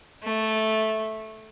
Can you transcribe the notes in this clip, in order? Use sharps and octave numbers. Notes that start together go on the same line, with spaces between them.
A3